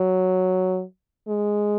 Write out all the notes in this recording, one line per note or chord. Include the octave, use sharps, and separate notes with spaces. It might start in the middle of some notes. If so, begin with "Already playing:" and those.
Already playing: F#3
G#3